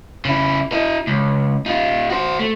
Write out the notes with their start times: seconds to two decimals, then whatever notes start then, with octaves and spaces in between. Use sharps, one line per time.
0.25 C#3 E4
0.72 E4 D#5
1.07 C#2
1.66 D#4 F4
2.10 F#4 C5
2.39 A3